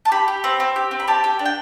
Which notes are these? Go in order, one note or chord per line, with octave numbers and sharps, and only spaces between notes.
A5
G4 B5
G4
C4
C4
G4
C4
B5
G4 A5
G4
D4
G5